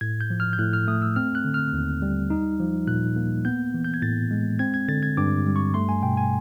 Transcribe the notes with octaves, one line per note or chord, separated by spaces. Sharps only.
A2 G#6
G6
F3
F6
G6
A2 F#6
F6
A3 D#6
E6
C4 F6
F#6
D3
F6
D#2
G3
D#4
F3
A#2 F#6
A#3
B3 G6
E3
G6
G#6
A2 A6
G#3
C4 G#6
G#6
D3 A6
G#6
G2 D6
G3
C#6
A3 C6
G#5
B2 G5
G#5